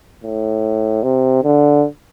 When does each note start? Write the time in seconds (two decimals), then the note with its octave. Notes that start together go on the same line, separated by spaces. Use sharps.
0.24 A2
1.03 C3
1.44 D3